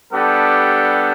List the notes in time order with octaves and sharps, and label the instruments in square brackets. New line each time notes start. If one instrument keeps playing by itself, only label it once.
[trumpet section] G3 B3 D4 G4 A4